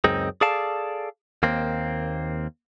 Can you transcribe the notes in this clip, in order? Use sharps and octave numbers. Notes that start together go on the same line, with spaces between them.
C#2 F#2 C4 D#4 G#4
G#4 A4 D5 F5 A5
D#2 A#3 C4